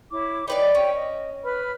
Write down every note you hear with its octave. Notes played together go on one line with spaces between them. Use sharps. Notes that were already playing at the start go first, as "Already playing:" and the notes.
E4 C#5 D6
D#4 B4 C#5 D5 G5 B5
C#4 C#5 G5
D#5
B4 B5 F6